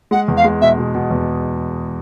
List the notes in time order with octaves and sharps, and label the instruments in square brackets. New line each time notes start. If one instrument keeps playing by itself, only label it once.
[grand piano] G#3 [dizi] F#5
[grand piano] E2
[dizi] F5
[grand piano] G#3
[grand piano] B2 [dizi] E5
[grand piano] B2
B2
E2